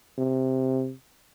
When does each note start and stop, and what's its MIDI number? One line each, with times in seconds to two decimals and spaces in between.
0.18 0.92 48